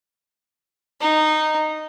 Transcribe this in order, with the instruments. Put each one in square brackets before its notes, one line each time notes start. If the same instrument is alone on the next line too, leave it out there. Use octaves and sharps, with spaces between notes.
[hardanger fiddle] D#4